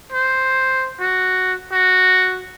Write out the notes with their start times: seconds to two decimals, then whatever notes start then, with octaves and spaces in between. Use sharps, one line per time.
0.12 C5
0.99 F#4
1.72 F#4